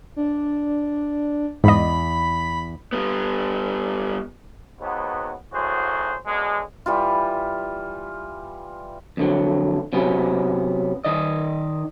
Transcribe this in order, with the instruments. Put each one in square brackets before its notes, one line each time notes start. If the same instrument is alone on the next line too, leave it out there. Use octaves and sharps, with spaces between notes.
[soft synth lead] D4
[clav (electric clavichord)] E2 [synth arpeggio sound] G#2 D#5 [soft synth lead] B5
[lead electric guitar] G3 B3
[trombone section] D#2 G#2 F#3 B3
G#1 A2 F#3 F#4 G#4 C5
F#2 B2 D3 G#3
[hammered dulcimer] E3 G3 F4
[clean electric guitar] F2 D3 F#3
C3 F#3 B3 C#4
D#3 D5 D#5